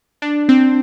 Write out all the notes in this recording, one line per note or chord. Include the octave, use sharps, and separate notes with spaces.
D4
C4